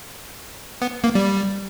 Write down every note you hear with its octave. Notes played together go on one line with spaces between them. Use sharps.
B3
A#3
G3